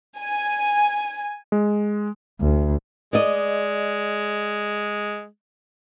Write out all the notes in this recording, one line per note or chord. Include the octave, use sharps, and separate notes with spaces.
G#5
G#3
D2
G#3 D5 D#5